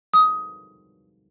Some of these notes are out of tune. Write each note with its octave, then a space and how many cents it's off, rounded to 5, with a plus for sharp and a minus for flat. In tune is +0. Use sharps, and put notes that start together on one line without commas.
D#6 +15